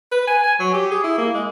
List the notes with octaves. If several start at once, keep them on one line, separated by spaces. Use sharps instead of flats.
B4
G#5
G#5
F#3
G4
G#4
E4
A#3
G#3